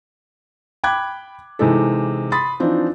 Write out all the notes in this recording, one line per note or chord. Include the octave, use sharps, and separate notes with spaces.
G5 B5 D6 F#6 G#6
C3 E3 G#3 D#4 A4
B5 C6 D#6 A6
E3 F3 C4 D4 D#4